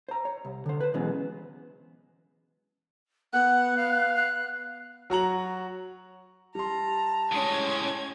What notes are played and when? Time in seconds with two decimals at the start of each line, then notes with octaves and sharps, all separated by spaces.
0.09 C5 A#5
0.25 C#5
0.45 C2
0.66 D3 C5
0.81 B4 C5
0.94 B2 E3 F#3 G#3 B3 C#4
3.33 B3 F#5 F#6
3.77 F5
4.15 F#6
5.10 F#3 F#4 A#5 F#7
6.55 G3 A5 A#5 C6
7.31 A2 G#3 C#4 G#6